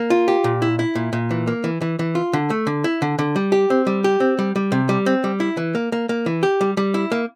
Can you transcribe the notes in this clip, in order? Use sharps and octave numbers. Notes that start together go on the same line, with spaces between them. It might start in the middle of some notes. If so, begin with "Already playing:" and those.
Already playing: A#3
F4
G4
A#2
E4
E4
A#2
A#2
E3
A#3
E3
E3
E3
F4
D3
A3
D3
E4
D3
D3
G3
G4
C4
G3
G4
C4
G3
G3
C3
G3
C4
G3
E4
E3
A#3
A#3
A#3
E3
G4
G3
G3
E4
A#3